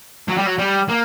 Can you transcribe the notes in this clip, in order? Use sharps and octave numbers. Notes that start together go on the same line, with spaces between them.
F#3
G3
F#3
G3
A#3